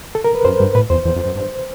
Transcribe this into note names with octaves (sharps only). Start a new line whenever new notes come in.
A4
A#4
B4
F#2 C5
G2
A2 B4
E2 C5
E2
F2
F#2
G2